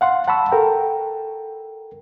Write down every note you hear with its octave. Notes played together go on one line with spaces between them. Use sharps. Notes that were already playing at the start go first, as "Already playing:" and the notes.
F5 F#5 C6
F#5 A5 B5 C#6 E6
A4 A#4 G5